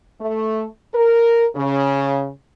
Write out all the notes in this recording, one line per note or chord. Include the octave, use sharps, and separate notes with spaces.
A3
A#4
C#3